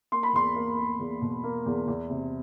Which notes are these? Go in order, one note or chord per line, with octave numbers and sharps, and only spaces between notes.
A#3 C6
B5
E2 C6
A#3
A#3
E2
B2
A#3
E2
E2
C3